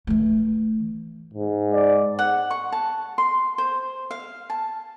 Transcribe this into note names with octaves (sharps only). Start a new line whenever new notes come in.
E3 A3
G#2
D5
F#5
C#6
A5
C6
C5
F5
A5